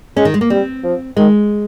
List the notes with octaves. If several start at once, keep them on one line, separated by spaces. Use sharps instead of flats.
G#3 C#4
D#3
G#3
A#3
G3 C4
F3
D#3 G#3